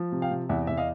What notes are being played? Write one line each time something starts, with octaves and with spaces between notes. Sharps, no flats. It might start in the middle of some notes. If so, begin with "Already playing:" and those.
Already playing: F3
C3
F5 G5
C3
E2 E5 F#5
E2 E5
D#5 F5